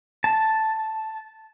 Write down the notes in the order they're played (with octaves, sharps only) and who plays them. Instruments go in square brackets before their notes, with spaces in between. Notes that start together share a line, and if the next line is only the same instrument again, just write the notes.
[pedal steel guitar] A5